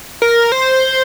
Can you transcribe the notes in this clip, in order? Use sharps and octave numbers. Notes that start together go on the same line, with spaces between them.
A#4
C5